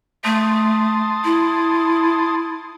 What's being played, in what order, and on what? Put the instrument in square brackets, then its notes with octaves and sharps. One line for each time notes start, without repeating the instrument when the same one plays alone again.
[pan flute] A3 [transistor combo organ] A5 C6 D#6
[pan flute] E4